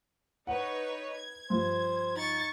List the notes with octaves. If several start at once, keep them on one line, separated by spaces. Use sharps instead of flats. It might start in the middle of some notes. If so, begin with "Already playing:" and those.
D#4 B4 C#5 F#5
G#6
G2 F3 C5
D#4 C#6 A6